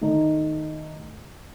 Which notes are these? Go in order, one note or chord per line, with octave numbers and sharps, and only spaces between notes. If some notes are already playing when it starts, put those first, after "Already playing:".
D#3 A3 D#4